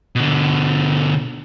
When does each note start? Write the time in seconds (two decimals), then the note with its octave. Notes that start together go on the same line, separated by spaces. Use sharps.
0.15 B2 D3